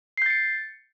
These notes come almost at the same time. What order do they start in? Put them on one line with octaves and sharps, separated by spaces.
C7 G6 A6 C#7